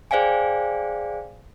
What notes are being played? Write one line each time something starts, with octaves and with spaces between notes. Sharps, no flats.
G#4 C5 D5 F5 G5 G#5